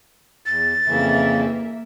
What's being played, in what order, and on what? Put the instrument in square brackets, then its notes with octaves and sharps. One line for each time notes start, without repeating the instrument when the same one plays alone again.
[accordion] E2 [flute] A6
[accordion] F2 C#3 E3 [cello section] A#3 E5